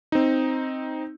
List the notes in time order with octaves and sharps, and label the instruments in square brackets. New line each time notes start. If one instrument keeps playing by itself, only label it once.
[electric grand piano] C4 D#4